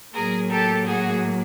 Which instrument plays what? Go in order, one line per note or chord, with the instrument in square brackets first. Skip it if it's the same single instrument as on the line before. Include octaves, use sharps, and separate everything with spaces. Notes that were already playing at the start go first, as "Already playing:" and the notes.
[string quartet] A2 F#3 A#3 G#4 A#4
G4 A4
F#4 G#4